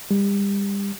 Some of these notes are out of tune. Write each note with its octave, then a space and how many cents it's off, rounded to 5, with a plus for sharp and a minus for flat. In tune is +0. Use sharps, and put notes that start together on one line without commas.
G3 +35